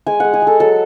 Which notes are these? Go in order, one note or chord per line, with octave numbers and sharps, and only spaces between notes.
G#3 G#5
G#3 F#5
G#4
G#3 A4
F#3 A4